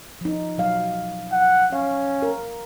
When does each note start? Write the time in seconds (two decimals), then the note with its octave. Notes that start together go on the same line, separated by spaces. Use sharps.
0.21 F3 D#4
0.58 B2 F#3 F5
1.32 F#5
1.73 C#4 F5
2.22 A#4